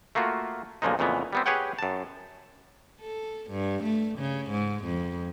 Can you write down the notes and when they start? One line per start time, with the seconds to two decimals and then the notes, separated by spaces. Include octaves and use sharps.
0.15 A3 A#3 F4 F#4
0.82 B1 A#2 C#3 F3 G#3 D#4
0.99 F2 A#2 C#3 E3 B3
1.33 G3 B3 C4
1.46 G4 G#4 B4 C#5 F#5 G5
1.79 F#2 A5
3.01 A4
3.51 G2
3.84 A3
4.19 C#3
4.50 G#2
4.85 F2